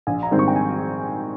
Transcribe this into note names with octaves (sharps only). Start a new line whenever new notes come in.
A#1 G#5
A#5
G#2 D#3 G3 C4
C#6
G5
G#5